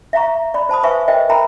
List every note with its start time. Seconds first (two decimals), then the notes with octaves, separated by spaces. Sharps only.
0.13 E5 F5 A#5 C#6
0.54 D5 B5
0.69 C5 A5 B5 D#6
0.83 B4 C5 E5 F5 G#5 C#6
1.08 A#4 C5 D#5 E5 G5
1.29 A#4 E5 G5 A#5 B5